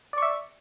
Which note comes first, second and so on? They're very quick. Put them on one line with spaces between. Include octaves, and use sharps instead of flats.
D5 C#6 E5